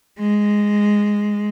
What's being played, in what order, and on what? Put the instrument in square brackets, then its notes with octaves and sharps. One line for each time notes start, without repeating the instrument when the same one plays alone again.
[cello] G#3